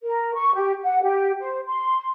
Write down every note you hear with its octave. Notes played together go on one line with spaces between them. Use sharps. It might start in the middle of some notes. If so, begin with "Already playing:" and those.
A#4
C#6
G4
F#5
G4
C5
C6